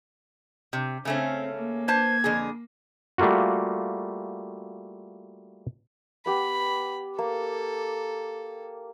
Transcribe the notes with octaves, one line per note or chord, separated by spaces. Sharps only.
C3
C#3 A3 C4 C#4
A#3
B4 C5 A5 G#6
F2 D3 G#4
G3 A3 A#3 F4 F#4
B3 G4 B4 B5
A#3 A4